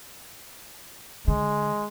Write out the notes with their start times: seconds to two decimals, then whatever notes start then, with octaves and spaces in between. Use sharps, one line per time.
1.28 D3 G#3